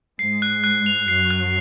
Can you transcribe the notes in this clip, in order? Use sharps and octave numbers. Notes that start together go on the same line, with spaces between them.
G#2 G#3 C7
F#6
F#6
F7
F#2 F#3 C7
F#6